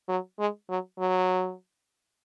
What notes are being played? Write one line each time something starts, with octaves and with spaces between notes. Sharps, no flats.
F#3
G#3
F#3
F#3